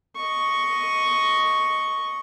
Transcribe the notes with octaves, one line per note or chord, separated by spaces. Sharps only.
D#5 C#6